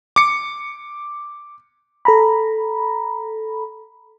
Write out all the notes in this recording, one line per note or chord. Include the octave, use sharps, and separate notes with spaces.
D6 C#7
A4 A#5 B5